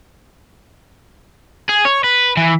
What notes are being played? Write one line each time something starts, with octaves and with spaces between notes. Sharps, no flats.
G#4
C#5
B4
E3